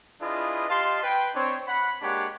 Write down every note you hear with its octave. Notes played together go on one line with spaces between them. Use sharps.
D4 E4 F4 G#4 B4 D#5
G4 D#5 F5 A5 C6
B4 G5
C4 D4 C#5
F#5 B5
G#3 A#3 D4 G4 C#5 F#5